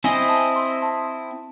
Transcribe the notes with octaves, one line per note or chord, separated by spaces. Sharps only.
C4 E4 C5 D#5 G#5
A5
C6
A5